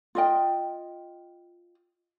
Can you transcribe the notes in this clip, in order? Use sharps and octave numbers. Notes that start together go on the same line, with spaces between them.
F4 D#5 G5